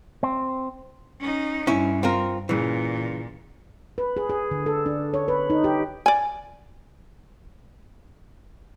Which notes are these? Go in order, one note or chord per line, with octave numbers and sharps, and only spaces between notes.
C4
C#4 D#4
G2 C#4 E4
C4 F4 A#4
A#2 C#3 E3
B4
G#4
G#4
D3
A4
D4
C#5
B4
D#4
G4
D5 G#5